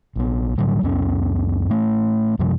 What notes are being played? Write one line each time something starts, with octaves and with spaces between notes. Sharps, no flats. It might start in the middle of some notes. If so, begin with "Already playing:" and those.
A#1 B3
A2 D3 F#3 G3
C#2 F#2 B3 C#4
A2 A3 C#4
F#2 C3 F3 G3